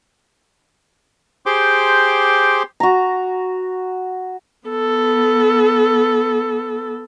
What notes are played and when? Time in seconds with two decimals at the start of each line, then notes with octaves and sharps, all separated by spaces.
1.46 G4 G#4 C5 G5 C6 D6
2.80 F#4 A#5
4.68 B3 A4